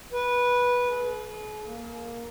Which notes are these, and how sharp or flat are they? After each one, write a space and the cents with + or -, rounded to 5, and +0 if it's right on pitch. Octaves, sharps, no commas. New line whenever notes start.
B4 -10
G#4 +40
A#3 +5